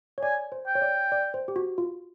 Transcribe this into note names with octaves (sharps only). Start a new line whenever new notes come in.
C#5
D5 G#5
C5
G5
C#5
D5
D5
C5
G4
F#4
F4